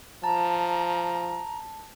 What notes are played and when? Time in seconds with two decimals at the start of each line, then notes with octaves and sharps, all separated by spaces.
0.24 F3 A5 A#5